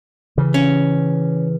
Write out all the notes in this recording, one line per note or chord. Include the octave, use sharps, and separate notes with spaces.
C#3 E3
C#4